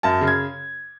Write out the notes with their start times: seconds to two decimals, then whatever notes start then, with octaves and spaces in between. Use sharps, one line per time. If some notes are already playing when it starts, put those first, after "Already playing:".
0.03 F#2 A5
0.21 C#3
0.27 G#6